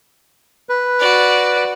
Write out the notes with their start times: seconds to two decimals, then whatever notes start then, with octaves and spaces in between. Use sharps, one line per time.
0.69 B4
0.99 F#4 D5